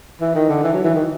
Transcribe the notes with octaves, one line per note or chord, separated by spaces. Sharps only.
E3
D#3
D3
E3
F#3
E3
D#3